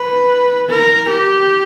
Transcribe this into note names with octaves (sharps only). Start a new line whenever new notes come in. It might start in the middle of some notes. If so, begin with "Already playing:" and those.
Already playing: B4
A#4
G4